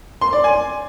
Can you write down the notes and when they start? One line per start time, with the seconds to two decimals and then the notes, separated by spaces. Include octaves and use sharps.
0.21 C6
0.33 D5
0.44 G#5